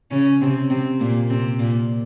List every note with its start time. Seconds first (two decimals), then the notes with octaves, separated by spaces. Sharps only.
0.11 C#3 C#4
0.41 C3 C4
0.70 C3 C4
1.00 A#2 A#3
1.30 C3 C4
1.59 A#2 A#3